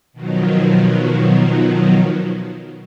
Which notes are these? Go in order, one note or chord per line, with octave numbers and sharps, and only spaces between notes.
B2 D#3 F3 F#3